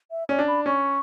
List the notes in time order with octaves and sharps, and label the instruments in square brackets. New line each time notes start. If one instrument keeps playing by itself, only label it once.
[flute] E5
[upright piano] C#4 [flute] D5
[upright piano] D4
[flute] B5
[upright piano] C#4 [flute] C#6